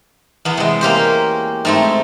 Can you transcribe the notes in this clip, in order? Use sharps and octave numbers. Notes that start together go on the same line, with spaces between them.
E2 B3
C3 G#3
A#3 C#4 G4 C5
G#2 A3 C4